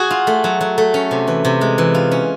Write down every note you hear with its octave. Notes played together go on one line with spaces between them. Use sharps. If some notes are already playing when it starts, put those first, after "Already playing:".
Already playing: F#4 G#4
F4
A3
F#3
F#3
A3
C#4
C3
E3
C3
G#3
E3
F4
C#4